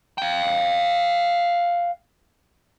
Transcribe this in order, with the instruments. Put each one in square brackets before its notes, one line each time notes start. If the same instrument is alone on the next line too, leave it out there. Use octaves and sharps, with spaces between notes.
[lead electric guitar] F5 G5